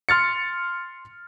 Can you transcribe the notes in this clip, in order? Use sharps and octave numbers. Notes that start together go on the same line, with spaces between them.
C6 F6 A6 C#7